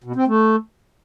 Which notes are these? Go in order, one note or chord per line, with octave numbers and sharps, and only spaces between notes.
B2
C4
A3